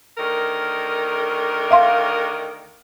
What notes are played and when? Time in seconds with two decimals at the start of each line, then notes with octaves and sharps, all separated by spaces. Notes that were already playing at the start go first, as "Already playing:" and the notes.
0.18 D2 D#3 A#4
1.71 E5 F5 C6